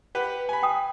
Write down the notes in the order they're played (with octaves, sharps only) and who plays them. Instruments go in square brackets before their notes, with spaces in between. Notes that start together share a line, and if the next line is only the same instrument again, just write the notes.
[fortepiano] G4 B4 F#5
G#5 B5
[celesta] G5 D#6